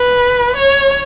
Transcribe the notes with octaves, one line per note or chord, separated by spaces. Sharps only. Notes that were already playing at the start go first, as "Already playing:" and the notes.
Already playing: B4
C#5